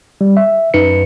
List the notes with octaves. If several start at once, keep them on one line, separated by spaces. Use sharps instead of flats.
G3
E5
F#2 D#4 B4 C#7